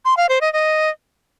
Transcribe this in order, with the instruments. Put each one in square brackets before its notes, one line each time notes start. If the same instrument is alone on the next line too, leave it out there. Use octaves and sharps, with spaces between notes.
[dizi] C6
F5
C5
D#5
D#5